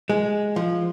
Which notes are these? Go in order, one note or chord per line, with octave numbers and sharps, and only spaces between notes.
G#3
F3